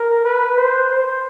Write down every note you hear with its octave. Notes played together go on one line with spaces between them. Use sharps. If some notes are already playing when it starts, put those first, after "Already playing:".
Already playing: A#4
B4
C5
C5